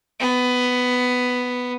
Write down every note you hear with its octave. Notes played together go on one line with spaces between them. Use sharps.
B3